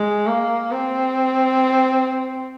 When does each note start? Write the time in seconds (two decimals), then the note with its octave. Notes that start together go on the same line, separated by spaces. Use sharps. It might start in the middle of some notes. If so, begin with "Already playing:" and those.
Already playing: G#3
0.27 A#3
0.71 C4